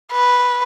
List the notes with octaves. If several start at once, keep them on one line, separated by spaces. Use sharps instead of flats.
B4